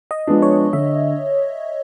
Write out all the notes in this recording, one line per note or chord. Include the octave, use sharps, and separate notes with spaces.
D#5
F3 G#3 B3 D4
C#5
D3 E5